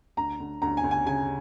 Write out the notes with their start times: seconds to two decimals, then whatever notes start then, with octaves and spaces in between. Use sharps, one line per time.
0.17 D2 A#5
0.40 D2
0.62 D2 A#5
0.77 G#5
0.84 D2
0.91 G#5
1.06 C#3 G#5